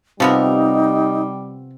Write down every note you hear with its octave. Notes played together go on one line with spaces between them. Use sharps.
C3 F3 G3 B3 D#4 A#4